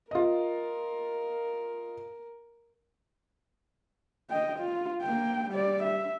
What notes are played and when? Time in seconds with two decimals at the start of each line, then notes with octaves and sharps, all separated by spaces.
0.11 F4 A#4 D#5
4.30 D#5 G5
4.60 F4
5.02 A#3 G5
5.51 G3 D5
5.84 E5